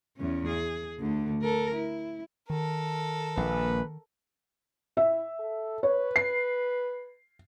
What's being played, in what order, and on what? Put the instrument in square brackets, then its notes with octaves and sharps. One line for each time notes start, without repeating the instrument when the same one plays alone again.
[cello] E2 C#4
G#4
D2 D3
A4 A#4
E4
[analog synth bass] D#3 [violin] A4 A#4
[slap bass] A#1 [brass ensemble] A#3 B4
[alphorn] E4 [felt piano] E5
[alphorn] A4
[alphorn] B4 [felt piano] C#5
[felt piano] C7